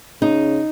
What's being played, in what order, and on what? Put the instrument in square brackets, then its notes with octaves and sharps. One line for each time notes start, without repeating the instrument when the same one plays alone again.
[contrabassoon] C#3 [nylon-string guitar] D#4